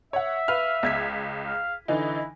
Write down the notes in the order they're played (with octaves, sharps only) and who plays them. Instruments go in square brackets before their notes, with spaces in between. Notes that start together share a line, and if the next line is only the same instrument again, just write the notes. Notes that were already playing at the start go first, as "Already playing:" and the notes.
[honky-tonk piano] C#5 F#5 [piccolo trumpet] E5
[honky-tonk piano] B4 F5 F6
C#2 G#6 B6
[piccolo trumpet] F5
[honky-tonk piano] D3 E3 D#4 [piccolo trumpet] E4